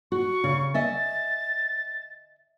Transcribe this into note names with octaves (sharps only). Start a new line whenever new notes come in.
F#4 C#6
C#3
D#5 E5 G#5 A6